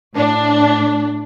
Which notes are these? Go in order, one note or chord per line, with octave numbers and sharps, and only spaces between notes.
A2 D4